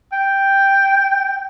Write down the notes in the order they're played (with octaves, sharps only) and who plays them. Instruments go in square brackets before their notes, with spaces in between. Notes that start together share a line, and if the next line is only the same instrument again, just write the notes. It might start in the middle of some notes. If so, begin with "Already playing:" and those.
[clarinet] G5